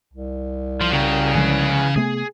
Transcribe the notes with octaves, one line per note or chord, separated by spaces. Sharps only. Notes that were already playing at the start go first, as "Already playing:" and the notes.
C2
F3 F4
C#3 F#4 G4 A#4
D3 E3 F3 G#3 G#4 B4
C3 A3 B3 G#4